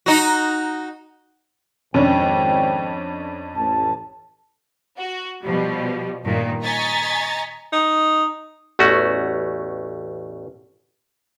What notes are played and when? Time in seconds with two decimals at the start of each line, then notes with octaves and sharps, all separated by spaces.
0.06 D#4 F#4
1.94 G#1 F2 C#4 D4 C5 G5
3.55 A1 A5
4.97 F#4
5.42 B2 F3 G3
6.23 G2 A#2 D#3
6.64 D#5 G#5 A#5 C#6 A6 B6
7.72 D#4
8.79 A1 E2 A3 C#4 F#4